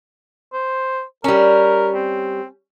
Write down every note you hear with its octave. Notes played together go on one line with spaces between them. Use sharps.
C5
G3 C#4 A#4
C4